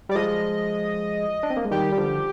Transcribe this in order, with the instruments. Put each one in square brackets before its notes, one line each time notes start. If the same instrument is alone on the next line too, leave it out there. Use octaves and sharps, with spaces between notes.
[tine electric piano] G3 [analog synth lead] D5
[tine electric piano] F3 G#3 [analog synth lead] D#5
[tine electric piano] D4
C4
A#3
G#3
[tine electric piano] D#3 G3 [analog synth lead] G4
[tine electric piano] G3
D3 F3